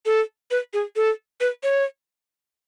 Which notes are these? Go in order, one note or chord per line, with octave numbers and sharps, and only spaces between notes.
A4
B4
G#4
A4
B4
C#5